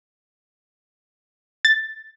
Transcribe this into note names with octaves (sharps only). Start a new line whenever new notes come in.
A6